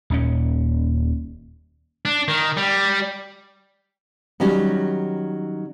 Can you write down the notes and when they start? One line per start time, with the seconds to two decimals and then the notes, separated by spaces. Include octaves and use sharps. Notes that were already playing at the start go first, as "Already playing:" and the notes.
0.10 D#1 D#2 C#4
2.05 D4
2.28 D#3
2.57 G3
4.40 D#3 F#3 G3 C#4